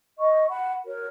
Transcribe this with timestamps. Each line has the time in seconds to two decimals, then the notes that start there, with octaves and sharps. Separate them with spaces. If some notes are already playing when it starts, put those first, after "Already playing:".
0.19 D#5 C#6
0.48 F#5 B5
0.86 F#4 A#4 C#5